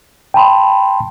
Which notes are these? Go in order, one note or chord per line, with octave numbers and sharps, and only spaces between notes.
G5 A5 B5 C6